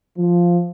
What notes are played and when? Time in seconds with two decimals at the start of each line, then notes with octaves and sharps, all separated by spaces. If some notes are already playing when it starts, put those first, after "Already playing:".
0.17 F3